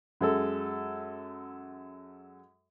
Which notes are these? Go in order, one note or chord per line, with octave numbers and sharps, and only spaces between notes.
F#2 G#3 A4